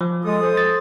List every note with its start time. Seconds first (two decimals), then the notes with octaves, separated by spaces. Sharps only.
0.01 F3
0.25 G#3 A4 D#6
0.42 C5
0.57 A6